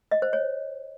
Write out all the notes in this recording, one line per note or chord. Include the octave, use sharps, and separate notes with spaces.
D#5
C5
C#5